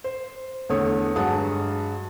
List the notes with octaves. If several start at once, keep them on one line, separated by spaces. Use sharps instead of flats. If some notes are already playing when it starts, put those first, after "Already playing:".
C5
E2 D3 A3 A4 C#5 D#6
G2 F#3 G#3 F#5 A5 D#6